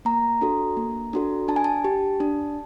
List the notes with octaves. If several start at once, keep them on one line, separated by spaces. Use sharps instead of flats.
A#3 A#5
D4 F#4 A4
A#3
D4 F#4 A4
D4 A5
G#5
A5
G4
D4